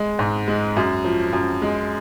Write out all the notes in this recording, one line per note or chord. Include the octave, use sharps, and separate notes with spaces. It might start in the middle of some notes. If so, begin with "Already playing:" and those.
Already playing: G#3
G#2
G#3
F#2
F3
F#2
G#3